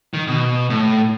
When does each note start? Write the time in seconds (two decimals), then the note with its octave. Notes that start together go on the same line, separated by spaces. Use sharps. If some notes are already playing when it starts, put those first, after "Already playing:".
0.14 D#3
0.28 B2
0.70 A2